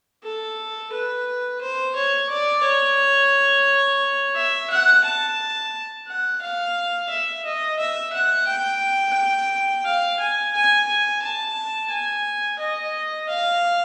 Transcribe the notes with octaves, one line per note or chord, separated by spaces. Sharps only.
A4
B4
C5
C#5
D5
C#5
E5
F#5
A5
F#5
F5
E5
D#5
E5
F#5
G5
F5
G#5
G#5
G#5
A5
G#5
D#5
F5